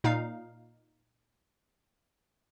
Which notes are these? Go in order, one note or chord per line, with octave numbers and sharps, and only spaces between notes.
A#2 D#4 F5